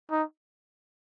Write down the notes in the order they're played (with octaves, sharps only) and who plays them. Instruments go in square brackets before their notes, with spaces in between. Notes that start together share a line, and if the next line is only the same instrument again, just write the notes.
[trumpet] D#4